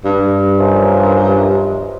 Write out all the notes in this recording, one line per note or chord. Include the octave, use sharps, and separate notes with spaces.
G2
F#2 D#3 F3